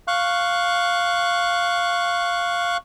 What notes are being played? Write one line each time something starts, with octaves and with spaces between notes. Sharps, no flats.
F5 C#6 F#6